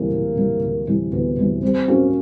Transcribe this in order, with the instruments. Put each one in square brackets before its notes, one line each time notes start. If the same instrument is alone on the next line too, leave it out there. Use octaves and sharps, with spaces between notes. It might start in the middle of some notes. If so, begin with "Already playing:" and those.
Already playing: [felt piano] D2 C3 E3 G3 [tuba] A#3
[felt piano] D2
C3 E3 G3
D2
C3 E3 G3
[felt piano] D2 [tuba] B3
[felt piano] C3 E3 G3
[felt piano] G3 [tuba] C4
[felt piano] A#3 C#4 F#4